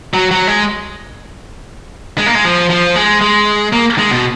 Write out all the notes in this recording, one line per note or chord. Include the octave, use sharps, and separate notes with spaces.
F#3
F#3
G#3
G#3
A#3
G#3
F3
F3
G#3
G#3
A#3
G#3
B2